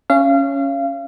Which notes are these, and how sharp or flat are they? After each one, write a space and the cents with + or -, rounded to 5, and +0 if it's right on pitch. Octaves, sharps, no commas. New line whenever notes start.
C#4 +0 F5 -30